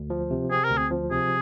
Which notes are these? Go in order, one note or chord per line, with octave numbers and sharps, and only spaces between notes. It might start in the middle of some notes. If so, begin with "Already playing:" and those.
Already playing: D2
F3
C3
C4 G#4
A#4
D2
G#4
F3
C3 G#4